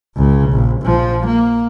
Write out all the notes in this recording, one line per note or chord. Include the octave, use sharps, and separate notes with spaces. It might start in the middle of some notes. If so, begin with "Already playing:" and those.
C#2 C#3
A#1
A#1 F3
A#3